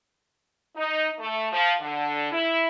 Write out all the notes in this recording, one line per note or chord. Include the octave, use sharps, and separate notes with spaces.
D#4
A3
F3
D3
E4